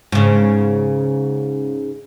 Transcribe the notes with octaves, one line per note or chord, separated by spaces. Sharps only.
G#2 C#3